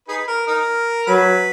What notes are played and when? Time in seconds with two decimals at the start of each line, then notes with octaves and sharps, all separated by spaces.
0.08 D#4 G#4 B4
0.27 A#4
0.47 D#4 A#4
1.07 F#3 B4